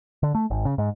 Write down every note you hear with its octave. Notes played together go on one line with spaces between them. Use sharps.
D3
A3
G#1
C#3
G#2